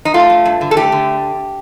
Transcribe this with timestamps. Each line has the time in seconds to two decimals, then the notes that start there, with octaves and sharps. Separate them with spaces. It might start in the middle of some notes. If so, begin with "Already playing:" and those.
0.05 D#4
0.14 A3 F4
0.30 G2
0.45 G2
0.61 D3
0.71 A4
0.77 A3 G4
0.92 D3